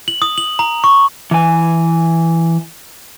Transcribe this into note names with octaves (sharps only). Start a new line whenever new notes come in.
F#7
D#6
F#7
A#5
C#6
E3 G#5